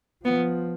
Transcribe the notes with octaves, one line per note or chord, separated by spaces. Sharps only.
F3 B3